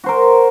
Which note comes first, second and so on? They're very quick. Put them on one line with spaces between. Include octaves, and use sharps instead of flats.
F#4 C5 A#4